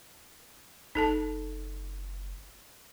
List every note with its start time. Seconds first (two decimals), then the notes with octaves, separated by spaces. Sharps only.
0.95 F#1 D#4 A4 A5